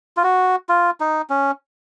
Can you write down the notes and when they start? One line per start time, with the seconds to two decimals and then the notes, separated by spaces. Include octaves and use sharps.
0.17 F4
0.24 F#4
0.69 F4
1.00 D#4
1.30 C#4